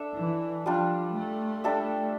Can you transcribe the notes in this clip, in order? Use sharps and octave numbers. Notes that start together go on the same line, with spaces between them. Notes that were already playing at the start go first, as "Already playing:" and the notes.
Already playing: D4 A4 E5
E3
F3 G3 D4 F4
A3
G3 D4 A4 E5